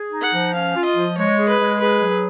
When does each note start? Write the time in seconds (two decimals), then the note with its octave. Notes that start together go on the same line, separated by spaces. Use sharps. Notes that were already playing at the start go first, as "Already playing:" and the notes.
Already playing: G#4
0.11 D#4
0.22 F#5
0.33 F3
0.54 C#4 F5
0.76 F4
0.85 D#5
0.96 F3
1.18 G#3 C#5
1.39 G#4
1.49 B4
1.60 G#3
1.80 G#4 B4
2.01 F#3